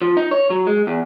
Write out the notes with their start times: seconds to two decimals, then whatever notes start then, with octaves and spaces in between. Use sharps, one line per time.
0.02 F3
0.17 D#4
0.31 C#5
0.50 F#3
0.67 G#3
0.87 E2